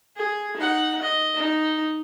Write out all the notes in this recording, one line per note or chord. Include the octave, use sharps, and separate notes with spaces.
G#4
D#4 F#5
D#5
D#4